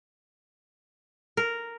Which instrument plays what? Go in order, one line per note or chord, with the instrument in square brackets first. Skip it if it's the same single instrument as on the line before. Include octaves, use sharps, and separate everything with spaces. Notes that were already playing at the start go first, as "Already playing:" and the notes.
[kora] A#4